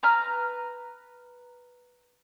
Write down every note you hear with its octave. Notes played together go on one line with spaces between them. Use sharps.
B4 A#5 F6